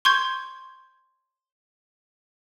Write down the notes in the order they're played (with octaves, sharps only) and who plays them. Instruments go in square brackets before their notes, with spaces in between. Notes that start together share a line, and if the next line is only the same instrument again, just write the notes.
[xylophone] C6 C#6 G6 G#6